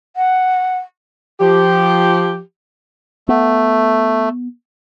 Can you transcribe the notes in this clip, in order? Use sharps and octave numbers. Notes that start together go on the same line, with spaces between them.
F#5
F3 G4
A3 B3